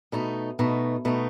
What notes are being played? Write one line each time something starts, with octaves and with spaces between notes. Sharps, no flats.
B2 A3 D#4
B2 A3 D#4
B2 A3 D#4